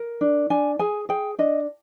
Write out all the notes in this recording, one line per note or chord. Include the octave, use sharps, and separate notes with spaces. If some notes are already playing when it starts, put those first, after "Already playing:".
Already playing: A#4
D4
D4 G#5
G#4 G#5
G#4 G5
D4 D#5